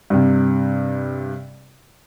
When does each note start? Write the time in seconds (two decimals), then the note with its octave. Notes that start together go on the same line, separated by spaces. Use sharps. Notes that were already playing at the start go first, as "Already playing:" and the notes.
0.10 G2 C3